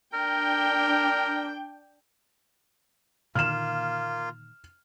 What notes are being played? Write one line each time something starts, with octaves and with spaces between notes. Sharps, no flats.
D4 A#4 G5
A#2 D3 D#3 A#3 F4 F6 E7